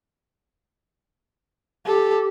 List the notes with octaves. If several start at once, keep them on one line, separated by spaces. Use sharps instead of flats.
G4 A4